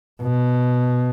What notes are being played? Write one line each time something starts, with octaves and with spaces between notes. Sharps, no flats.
B2